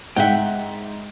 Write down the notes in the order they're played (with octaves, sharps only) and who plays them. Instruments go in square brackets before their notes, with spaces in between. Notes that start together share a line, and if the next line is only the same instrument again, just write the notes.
[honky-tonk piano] G#2 [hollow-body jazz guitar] E5 F#5 G5